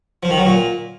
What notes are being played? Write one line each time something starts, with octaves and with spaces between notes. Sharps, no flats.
F3
D#3
F#3
A#2